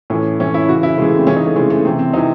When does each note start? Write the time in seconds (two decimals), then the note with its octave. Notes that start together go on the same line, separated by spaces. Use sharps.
0.10 A2 E3 C#4
0.40 A2 E3 C#4
0.54 E4
0.68 C#3 E3 F#4
0.83 E4
0.98 C#3 G#3
1.02 E3
1.07 A3
1.17 C4
1.27 C#3 E3 C#4
1.36 D#4
1.46 A3
1.56 E3 G#3
1.59 C#3
1.70 A3
1.85 C3 C4
1.89 E3
1.99 C4
2.13 C3 E3 D#4